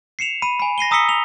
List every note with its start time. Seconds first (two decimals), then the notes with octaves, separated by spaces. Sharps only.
0.19 C7 C#7 E7 F7
0.42 B5 D#7
0.60 G#5 B5
0.78 A#6 C7 D#7 G7
0.91 A#5 D#6 E6 B6 C#7 G7
1.08 F7 G7